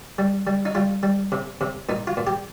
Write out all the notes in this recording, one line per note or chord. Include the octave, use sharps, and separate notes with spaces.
G3
G3
D#4
G3 F4
G3
C3
C3
A#2 D#4
F4
A#2
G4